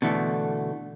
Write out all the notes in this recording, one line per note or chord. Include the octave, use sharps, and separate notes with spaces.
B2 D3 E3 A3